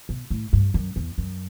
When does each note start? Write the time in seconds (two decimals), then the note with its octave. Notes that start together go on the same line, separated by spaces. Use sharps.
0.09 B2
0.30 A2
0.53 G2
0.74 F#2
0.96 E2
1.18 F#2